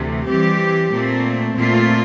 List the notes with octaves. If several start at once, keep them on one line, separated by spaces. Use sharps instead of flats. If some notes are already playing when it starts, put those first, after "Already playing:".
Already playing: D2 C3 E3 A3
E3 G3 C4 G4
A#2 A3 C4
A#2 A3 C4 F4